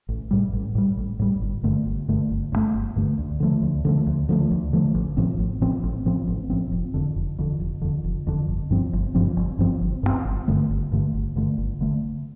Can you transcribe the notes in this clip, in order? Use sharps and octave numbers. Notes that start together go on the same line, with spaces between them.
A1
A2 G3
A1
A2 G3
A1
A2 G3
G1
G2 D3 A3
G1
G2 D3 A3
G1
G2 D3 A3
G1
G2 D3 A3
D2
D3 F3 A3
D2
D3 F3 A3
D2
D3 F3 A3
D2
D3 F3 A3
A1
A2 F3 C4
A1
A2 F3 C4
A1
A2 F3 C4
A1
A2 F3 C4
F1
F2 D3
F1
F2 D3
F1
F2 D3
F1
F2 D3
G1
G2 F3 C4
G1
G2 F3 C4
G1
G2 F3 C4
G1
G2 F3 C4
G1
G2 D3 A3
G1
G2 D3 A3
G1
G2 D3 A3
G1
D3 A3